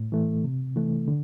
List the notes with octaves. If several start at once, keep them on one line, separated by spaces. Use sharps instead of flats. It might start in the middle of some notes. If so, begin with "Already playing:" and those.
Already playing: A2
E3 A3
C3
E3 A3
D3